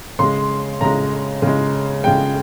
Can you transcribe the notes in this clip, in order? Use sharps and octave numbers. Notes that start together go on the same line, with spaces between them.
C#3 G#3 C6
C#3 G#3 A#5
C#3 G#3
C#3 G#3 G5